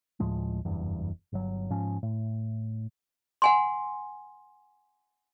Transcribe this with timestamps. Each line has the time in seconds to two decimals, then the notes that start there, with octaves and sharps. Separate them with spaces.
0.20 D2 A2 F3 G#3
0.65 F#1 E2 G2
1.32 G1 F#3
1.70 G#2 F3 C#4
2.03 A2
3.42 F#5 G#5 C6